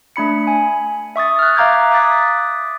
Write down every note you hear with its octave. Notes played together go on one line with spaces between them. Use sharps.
A3 D4 B5 C#7
G#5
E5 C#6 D#6 A6
F6 F#6
E5 F5 A#5 D6 G6 G#6
D6 D#6 F#6 A6 B6